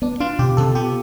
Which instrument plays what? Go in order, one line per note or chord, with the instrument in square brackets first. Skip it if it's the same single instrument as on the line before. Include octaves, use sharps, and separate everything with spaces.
[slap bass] B3 [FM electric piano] D4
[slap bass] D4 [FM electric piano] F4
[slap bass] B2 [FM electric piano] G4
[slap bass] B2 [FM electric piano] A4
[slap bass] B3 [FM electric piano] G4